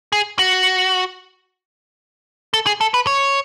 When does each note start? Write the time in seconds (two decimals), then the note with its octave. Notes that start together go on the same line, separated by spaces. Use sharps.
0.12 G#4
0.39 F#4
2.54 A4
2.66 G#4
2.81 A4
2.94 B4
3.07 C#5